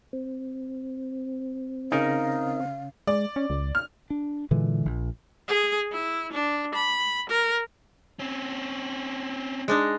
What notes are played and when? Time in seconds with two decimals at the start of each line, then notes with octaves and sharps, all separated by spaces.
0.13 C4
1.92 C#3 C#4 D#4 A#4 F5
3.07 G#3 D5
3.36 C#4
3.50 C#2
3.75 F6
4.10 D4
4.51 A#2 D3 E3 G#3
4.86 A#1
5.48 G#4
5.92 E4
6.33 D4
6.75 B5
7.30 A#4
8.19 C4 C#4
9.68 G#3 D4 D#4